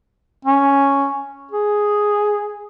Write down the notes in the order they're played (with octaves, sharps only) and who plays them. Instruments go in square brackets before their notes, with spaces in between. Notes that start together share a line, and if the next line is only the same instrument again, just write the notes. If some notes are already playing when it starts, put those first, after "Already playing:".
[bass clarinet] C#4
G#4